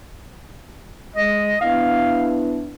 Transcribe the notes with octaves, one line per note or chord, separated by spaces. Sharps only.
G#3 D#5
B3 D4 E4 F5